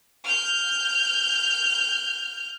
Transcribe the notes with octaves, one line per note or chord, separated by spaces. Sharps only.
F6 G6